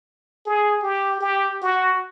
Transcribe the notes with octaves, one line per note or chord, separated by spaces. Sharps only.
G#4
G4
G4
F#4